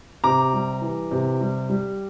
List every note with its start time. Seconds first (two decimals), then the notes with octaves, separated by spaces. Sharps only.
0.24 C3 A#5 D6
0.53 G3
0.81 E3
1.11 C3
1.41 G3
1.69 G3